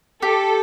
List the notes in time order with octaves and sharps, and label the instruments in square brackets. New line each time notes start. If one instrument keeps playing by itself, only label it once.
[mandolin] G4 [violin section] A4